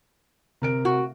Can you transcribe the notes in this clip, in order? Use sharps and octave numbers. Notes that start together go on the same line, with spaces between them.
C3 A#4 D7
F#4